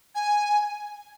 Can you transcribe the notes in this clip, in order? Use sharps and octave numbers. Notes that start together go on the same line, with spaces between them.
G#5